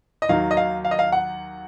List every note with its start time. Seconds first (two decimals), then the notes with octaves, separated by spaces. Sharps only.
0.22 D#5
0.29 D#2 D#3 F#3 F5
0.51 D#5
0.57 F5
0.85 F5
0.91 D#5
0.99 F5
1.12 F#5